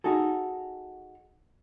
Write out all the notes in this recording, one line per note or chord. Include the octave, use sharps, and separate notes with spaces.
D#4 F#4 G#4 A4